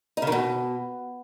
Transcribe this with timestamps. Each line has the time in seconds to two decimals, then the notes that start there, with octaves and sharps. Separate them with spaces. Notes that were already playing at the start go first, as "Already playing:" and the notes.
0.17 D#4
0.22 C#3
0.27 D#3
0.32 B2